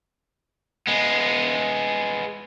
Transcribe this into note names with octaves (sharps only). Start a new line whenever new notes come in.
G#3 B3